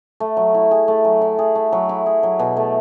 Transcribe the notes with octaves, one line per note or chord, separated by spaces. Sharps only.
A3
F#3
E4
G#4
A3
F#3
E4
G#4
A3
F#3
E4
G#4
F#3
B2
A3